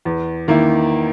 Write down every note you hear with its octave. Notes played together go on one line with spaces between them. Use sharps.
E2
D#3 A#3 E4